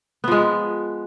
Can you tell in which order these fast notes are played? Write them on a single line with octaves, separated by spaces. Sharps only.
B3 F3 G#3